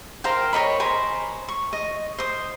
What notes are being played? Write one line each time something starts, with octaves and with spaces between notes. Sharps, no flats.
A#4 C5 F5 G5
A#4 C#5 D#5 B5
C5 G#5 B5
C#6
D#5
C5 D#6